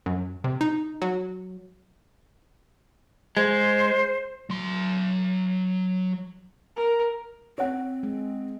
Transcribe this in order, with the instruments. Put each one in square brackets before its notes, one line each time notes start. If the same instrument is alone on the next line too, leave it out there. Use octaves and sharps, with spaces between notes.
[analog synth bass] F#2
C3
D#4
F#3
[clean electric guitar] G#3 [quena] C5
[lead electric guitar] F#3 C6
[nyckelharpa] A#4
[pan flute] C4 [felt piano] C#5 F#5
[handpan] G#3